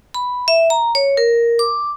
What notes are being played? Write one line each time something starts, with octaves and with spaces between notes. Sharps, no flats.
B5
E5
A#5
C#5
A#4
D6